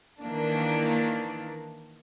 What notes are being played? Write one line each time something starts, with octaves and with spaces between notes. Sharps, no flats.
D#3 E3 A#3 D4